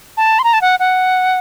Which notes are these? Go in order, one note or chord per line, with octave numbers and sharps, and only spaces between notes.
A5
C6
A#5
A5
F#5
F#5